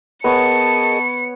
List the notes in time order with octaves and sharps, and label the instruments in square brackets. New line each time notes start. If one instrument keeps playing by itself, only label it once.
[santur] B3 C#5 [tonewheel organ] G#4 A#4 D#5 [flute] A5 [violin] C#7